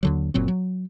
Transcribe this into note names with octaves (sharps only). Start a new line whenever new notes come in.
D#2 D3 F#3
F#1 A#2 F#3 C4
F#3